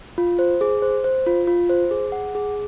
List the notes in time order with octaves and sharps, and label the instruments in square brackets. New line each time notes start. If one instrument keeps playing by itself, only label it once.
[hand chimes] F4
C5
G#4
C5
C5
F4
F4
C5
G#4
F#5
G#4